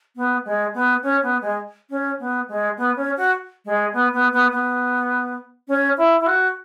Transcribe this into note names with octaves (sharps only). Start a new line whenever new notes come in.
B3
G#3
B3
C#4
B3
G#3
C#4
B3
G#3
B3
C#4
F#4
G#3
B3
B3
B3
B3
C#4
E4
E4
F#4